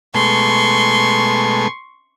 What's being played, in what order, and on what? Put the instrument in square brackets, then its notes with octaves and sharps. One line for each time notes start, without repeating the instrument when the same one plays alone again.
[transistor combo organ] B2 G#3 A3 [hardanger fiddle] C6 C#6